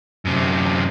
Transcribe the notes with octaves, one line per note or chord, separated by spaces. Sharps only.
F#2 C3